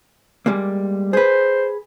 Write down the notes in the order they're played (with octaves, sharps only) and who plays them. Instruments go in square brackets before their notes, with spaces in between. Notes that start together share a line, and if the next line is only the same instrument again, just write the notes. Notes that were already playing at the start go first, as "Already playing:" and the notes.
[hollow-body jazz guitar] G3 G#3 A#3
[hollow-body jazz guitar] G#4 B4 [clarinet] C5